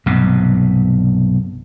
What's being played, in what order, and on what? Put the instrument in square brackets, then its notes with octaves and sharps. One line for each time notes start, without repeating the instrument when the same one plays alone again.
[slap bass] B1 G2 C3